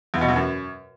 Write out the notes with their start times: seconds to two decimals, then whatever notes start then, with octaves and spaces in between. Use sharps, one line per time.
0.14 E2
0.21 B2
0.29 E2
0.36 F#2